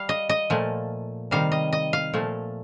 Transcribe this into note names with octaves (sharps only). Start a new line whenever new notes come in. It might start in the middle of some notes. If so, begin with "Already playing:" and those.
Already playing: G3 F5
D#5
D#5
A#2 F3 A3
C3 D#3 G3 F5
D#5
D#5
F5
A#2 F3 A3